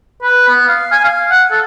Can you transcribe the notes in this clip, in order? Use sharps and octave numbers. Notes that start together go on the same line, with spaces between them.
B4
B3
F5
G#5
F5
F#5
A4